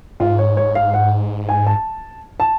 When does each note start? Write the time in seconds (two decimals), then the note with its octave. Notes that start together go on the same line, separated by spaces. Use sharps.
0.20 G#2 F4
0.39 C#5
0.57 C#5
0.75 F5
0.94 F#5
1.49 G#5
1.67 A5
2.40 A5